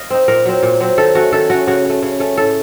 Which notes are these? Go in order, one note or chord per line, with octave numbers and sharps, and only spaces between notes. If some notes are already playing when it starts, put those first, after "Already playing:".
Already playing: D#5 F5
C4 D#4
A#2 A#4
F#3 C4
A#2
F#3 C4
D#3 A4
A3 C#4 F#4
D#3 A4
A3 C#4 F#4
C#3 F#4
A3 C#4
C#3
A3 C#4
A2 A4